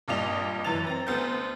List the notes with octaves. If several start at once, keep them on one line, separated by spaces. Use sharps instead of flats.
G#1 G2 A#2 D#5 F7
F#2 E3 B4 A6 F7
C4 A#5
D2 B3 C5 G6